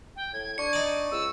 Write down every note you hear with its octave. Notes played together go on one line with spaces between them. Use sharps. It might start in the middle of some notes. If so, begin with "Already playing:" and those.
G5
A2 G#6
D4 C#6 C#7
D#4 D5
C#2 E6